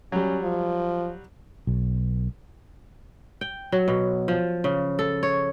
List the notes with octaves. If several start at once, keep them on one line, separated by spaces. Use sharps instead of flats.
F#3 G3 C#4
F3
B1
G5
F#3
B2
F3
C#3
A4
C#5